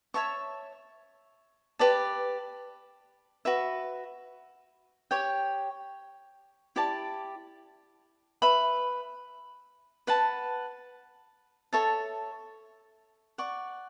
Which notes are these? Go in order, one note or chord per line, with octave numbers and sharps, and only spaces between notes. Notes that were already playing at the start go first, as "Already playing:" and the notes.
C#5 E5 A5 C#6
G4 B4 D5 A5
F#4 B4 E5
G4 C#5 G5
E4 G4 D5 A5
B4 E5 B5
B4 F#5 A5
A4 C#5 E5 A5
D5 F#5 C#6